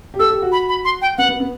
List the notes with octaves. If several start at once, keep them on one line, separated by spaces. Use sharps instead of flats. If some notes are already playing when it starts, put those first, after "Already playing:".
G4
A4 E6
G4
F#4
B5
B5
C6
G5
B3 F#5
B3
B3